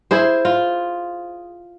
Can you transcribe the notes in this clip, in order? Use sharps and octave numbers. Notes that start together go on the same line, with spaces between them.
E4 G#4 C5
F4